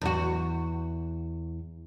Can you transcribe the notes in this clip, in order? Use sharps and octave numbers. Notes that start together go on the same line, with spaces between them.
E2 F#4